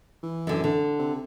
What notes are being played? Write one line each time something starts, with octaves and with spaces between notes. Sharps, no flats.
E3
F#2 D3
D3
C3